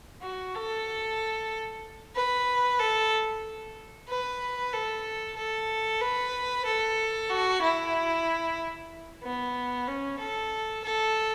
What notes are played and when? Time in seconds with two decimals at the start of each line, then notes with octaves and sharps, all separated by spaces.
0.22 F#4
0.55 A4
2.16 B4
2.80 A4
4.09 B4
4.73 A4
5.37 A4
6.02 B4
6.65 A4
7.30 F#4
7.62 E4
9.24 B3
9.88 C#4
10.20 A4
10.84 A4